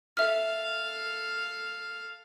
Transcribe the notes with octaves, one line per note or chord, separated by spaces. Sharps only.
A4 E5 F5 F6